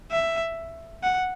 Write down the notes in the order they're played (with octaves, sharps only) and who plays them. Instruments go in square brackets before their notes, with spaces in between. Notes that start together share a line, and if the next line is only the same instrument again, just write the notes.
[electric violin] E5
F#5